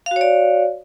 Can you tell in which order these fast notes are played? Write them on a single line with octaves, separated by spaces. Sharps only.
F5 F#4 C#5 D5